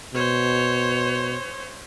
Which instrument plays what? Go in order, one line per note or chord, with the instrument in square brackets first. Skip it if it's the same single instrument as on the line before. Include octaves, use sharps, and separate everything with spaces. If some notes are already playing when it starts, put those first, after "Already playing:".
[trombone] B2 [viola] C5 C#5